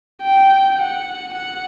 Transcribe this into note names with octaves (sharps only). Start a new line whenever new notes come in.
G5
F#5
F#5